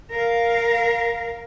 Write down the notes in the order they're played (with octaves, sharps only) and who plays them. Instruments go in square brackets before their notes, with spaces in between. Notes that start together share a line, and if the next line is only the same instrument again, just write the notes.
[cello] A#4 F5